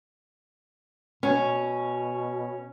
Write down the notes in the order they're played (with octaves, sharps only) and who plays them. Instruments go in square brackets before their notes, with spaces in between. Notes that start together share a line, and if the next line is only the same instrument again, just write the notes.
[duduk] B2 [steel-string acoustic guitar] C#4